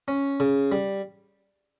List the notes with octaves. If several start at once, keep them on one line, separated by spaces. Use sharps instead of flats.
C#4
C#3
G3